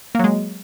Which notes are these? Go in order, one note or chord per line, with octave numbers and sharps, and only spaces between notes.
F#3 G#3 A#3